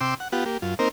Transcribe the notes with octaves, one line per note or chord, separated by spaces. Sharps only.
C3 G5 C6 D6 E6
F#5
B3 F4 G4 F#5
A#3 G4
F#2 F4
A#3 C4 D#4 A#4 C5